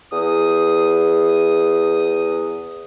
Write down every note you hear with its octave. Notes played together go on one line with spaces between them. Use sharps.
E2 D#6